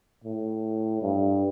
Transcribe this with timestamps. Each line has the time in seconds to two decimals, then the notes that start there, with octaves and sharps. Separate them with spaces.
0.24 A2
1.02 G2